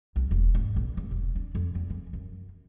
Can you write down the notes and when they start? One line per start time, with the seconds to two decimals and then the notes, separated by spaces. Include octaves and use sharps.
0.16 B1
0.31 E1
0.54 G#2
0.76 A#1
0.97 C#2
1.11 E1
1.35 D4
1.55 F2
1.75 E2
1.90 E3
2.13 F#2